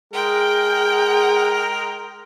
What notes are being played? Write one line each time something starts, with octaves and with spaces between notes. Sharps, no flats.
G#3 G#4 A#4 G5